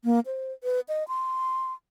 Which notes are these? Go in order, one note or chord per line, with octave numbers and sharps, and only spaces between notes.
A#3
C5
B4
D#5
C6